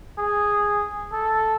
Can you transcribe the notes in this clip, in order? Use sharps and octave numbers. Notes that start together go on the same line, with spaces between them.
G#4
A4